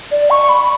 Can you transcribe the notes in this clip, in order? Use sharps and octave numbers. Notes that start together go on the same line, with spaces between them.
D5
C#6
B5